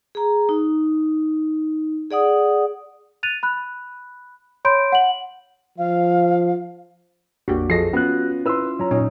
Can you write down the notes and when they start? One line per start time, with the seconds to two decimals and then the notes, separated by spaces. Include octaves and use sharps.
0.15 G#4 A#5
0.49 D#4
2.11 G#4 D5 F#5 D#6
3.23 F#6 A6 D#7 F7
3.43 B5 F#6
4.65 C#5 B5 C6 G6 D7
4.92 F#5 F#7
5.78 F3 F5
7.48 A#1 F2 A#3 D4 F#4 G4
7.70 F3 G#4 A4 D#5 A#6 C7
7.93 B3 C#4 F4 F#4 F#6
8.46 E4 B4 C6 E6
8.79 F#3 C#4 F4 A#5
8.91 A#2 C#4 D#4